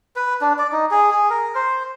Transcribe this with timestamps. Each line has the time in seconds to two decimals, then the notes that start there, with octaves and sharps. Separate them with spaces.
0.16 B4
0.41 D4
0.58 D5
0.72 D#4
0.91 G#4
1.11 G#4
1.30 A#4
1.55 C5